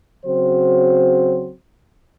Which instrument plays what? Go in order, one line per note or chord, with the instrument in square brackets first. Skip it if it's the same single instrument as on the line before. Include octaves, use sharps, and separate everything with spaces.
[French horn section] C#3 F#3 C4 F#4 C5